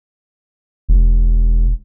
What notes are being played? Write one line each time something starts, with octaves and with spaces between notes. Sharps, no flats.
E1